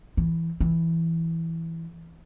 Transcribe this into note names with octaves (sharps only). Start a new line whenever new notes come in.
E3
E3